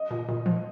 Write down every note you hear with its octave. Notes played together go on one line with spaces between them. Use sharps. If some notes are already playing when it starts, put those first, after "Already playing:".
Already playing: D#5
A#2
A#2
F3